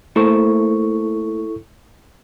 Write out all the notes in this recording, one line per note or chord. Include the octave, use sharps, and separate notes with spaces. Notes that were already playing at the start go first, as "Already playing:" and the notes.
A3 A#3 E4 A4 C5 C#6